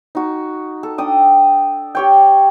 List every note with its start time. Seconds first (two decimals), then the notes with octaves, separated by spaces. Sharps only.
0.15 D#4 F#4
0.83 A4
0.98 D4 G5 D#6
1.95 G4 C#5 G5